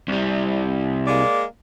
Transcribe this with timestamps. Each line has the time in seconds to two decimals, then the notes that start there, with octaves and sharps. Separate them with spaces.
0.08 C2 G3
1.07 G#3 A#3 D5